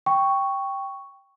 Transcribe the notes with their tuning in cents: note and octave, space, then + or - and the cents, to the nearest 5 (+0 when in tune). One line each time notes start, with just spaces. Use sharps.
G5 +0 C#6 +0